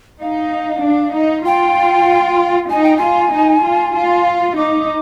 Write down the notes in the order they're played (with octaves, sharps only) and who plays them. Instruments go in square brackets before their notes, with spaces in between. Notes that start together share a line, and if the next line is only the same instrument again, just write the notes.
[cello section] D#4 [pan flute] F5
[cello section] D4
D#4
[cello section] F4 [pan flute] G5
[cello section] D#4 [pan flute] G#5
[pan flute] G5
[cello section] F4 [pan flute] G#5
[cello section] D#4
F4
F4
[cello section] D#4 [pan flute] D6